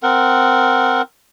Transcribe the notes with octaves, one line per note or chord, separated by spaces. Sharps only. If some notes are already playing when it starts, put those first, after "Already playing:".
C4 A#4 F#5